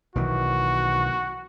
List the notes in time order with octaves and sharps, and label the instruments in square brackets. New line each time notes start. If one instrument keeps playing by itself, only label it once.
[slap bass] B1 D#3 E3 [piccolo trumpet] F#4